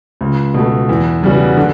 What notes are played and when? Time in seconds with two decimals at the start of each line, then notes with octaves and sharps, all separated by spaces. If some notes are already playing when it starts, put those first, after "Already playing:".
0.21 C#2
0.54 B2 A3
0.89 E2
1.23 C#3 G3 B3 F#4
1.57 D3